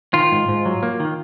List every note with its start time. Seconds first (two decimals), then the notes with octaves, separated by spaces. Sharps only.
0.14 D#3 F4
0.32 G#2
0.48 G#2
0.65 F#3
0.83 A#3
1.00 D#3